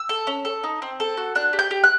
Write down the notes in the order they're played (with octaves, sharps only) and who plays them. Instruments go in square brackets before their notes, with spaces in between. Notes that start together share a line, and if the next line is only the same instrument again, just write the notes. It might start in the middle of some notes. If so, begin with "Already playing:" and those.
Already playing: [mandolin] E6
A4
C#4
A4
D#4
C4
A4
F#4
D4 F#6
G4
G6
G4
F#6